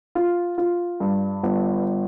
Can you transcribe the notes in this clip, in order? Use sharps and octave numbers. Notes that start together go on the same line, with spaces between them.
F4
F4
G2
G1